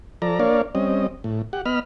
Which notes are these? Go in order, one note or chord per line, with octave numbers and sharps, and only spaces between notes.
F3 A4 D5 A#5
A#3 D4 A#4 C#5 D5 F5
G3 C4 C#4 D#5
A2
G4 F#5
B3 D#5 B5 F6